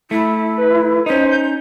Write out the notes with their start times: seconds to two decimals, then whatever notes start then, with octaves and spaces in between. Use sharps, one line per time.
0.11 A3 E4
0.57 B4
1.06 C#4 D#4 C5 D#5
1.31 G6